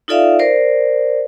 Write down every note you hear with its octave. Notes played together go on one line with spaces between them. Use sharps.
D#4 F4 A4 D5 E5 F5
A#4 C5 D5